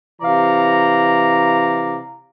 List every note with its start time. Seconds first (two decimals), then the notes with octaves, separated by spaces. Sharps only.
0.22 C3 E3 D5 F5 A#5